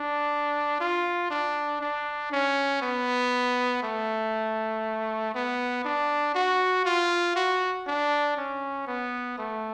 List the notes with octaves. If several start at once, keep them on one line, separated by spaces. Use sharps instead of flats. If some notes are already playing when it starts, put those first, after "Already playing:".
Already playing: D4
F4
D4
D4
C#4
B3
A3
B3
D4
F#4
F4
F#4
D4
C#4
B3
A3